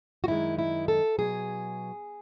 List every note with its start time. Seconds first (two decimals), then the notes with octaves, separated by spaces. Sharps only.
0.24 F#4
0.28 F#2 D#3 G#3 E4
0.59 E4
0.88 A4
1.19 B2 F#3 G#4